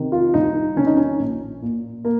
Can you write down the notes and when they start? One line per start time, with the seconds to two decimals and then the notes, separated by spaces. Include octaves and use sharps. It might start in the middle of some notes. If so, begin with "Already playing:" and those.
Already playing: C3 D#3
0.12 F4
0.34 C2 D#4
0.76 C3 D#3 C#4
0.87 D#4
0.97 C#4
1.19 A#1
1.62 A#2
2.05 A#3